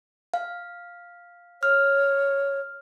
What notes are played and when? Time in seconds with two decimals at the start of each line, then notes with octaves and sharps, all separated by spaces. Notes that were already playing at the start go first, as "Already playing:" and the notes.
0.34 F5
1.63 C#5 F6